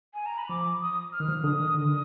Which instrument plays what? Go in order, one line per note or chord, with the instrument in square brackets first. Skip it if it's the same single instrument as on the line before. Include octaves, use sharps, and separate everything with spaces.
[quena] G#5
A#5
B5
[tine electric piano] F3 [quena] D6
[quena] D#6
F6
[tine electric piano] D#3
F3
[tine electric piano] D3 [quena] D#6
[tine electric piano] D#3
D3